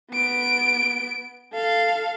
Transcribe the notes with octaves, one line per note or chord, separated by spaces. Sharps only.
B3 D7
A4 F5